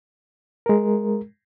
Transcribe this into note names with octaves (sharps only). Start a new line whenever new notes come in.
G#3 A#4